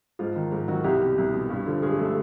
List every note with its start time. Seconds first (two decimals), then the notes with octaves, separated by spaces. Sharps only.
0.19 G#2 F3 F4
0.36 D#3
0.52 G#2
0.68 D#3 F#3 F#4
0.84 C2 G3 G4
1.01 B2
1.18 C2
1.33 B2
1.50 G2
1.66 D3 F3
1.82 G2 G#3 G#4
1.99 D3 F3 A3 A4